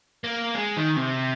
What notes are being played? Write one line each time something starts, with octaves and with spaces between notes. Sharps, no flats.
A#3
G#3
D#3
C3